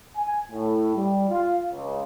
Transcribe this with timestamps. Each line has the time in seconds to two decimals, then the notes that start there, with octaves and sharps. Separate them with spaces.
0.17 G#5
0.51 A2
0.95 G3
1.29 F4
1.72 C#2